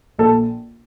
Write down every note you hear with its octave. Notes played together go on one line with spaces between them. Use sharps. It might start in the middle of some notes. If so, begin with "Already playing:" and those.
A#1 A4